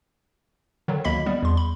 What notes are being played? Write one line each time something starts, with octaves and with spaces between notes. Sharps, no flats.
D3 D#3 F#3
D2 A#3 D#5 B5 B6
G3 B3
E2 C6
B5